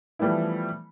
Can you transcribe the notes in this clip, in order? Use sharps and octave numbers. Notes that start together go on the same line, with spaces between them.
E3 F3 G3 A3 B3 E4